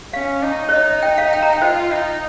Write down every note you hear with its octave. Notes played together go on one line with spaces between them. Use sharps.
C#4 F5
D#4
C#5
D#4 D#5
G5
F5
G5
A#5
G5
F4 C5
D#4